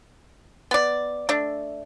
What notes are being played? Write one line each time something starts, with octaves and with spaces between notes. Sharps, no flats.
B3 D5
A3 D4